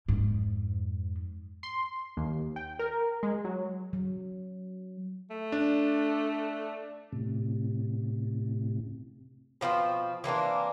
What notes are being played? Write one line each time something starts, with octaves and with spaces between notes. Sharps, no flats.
F2 G#2
C6
D#2
G5
A#4
G#3
F#3
F#3
A3
D4
A2 C3
B2 F3 A#3 C4
E3 A#3 C4 D4